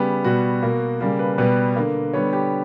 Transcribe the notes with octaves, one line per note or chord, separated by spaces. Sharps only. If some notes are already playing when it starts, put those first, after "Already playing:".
Already playing: C#3 G3 B3 G4
B2 G3 B3 F#4
B2 A#3
C#3 G3 A#3
B4
B2 G3 B3 B4
D3 A#3
D3 G3 B3 C#5
G4